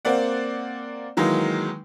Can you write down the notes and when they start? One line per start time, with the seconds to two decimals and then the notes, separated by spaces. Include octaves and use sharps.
0.05 A#3 C4 D5 F#5
1.17 D#3 E3 F#3 G#3 A#3 D#4